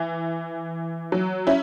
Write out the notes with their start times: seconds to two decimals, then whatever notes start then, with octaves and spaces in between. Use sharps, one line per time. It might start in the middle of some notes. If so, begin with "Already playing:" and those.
Already playing: E3
1.12 F#3
1.47 C#4 E4